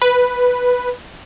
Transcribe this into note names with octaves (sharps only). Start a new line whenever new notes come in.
B4